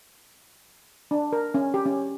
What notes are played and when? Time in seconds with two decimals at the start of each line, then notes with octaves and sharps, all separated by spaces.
1.11 D4
1.33 A#4
1.54 C#4
1.74 G4
1.86 C#4